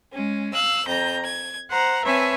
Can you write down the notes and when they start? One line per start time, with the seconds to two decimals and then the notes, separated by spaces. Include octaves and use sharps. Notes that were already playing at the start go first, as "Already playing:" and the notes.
0.12 G#3 C#4
0.52 F5 E6 F#6
0.85 F2 A#5 G6
1.23 G#6
1.68 C5 F#5 A#5
2.03 C4 B4 C#5 E5 G#5 A5